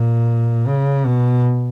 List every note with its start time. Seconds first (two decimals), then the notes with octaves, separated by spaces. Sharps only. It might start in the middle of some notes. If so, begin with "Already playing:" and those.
Already playing: A#2
0.67 C#3
1.06 B2